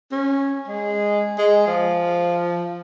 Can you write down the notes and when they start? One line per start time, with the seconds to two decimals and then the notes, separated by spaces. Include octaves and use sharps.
0.12 C#4
0.68 G#3
1.38 G#3
1.67 F3